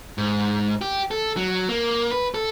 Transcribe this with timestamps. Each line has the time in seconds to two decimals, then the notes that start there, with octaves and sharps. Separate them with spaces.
0.18 G#2
0.81 G4
1.11 A4
1.37 F#3
1.69 A#3
2.11 B4
2.34 A4